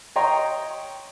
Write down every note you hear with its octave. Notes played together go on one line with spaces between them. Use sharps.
C#5 D#5 G5 A#5 C6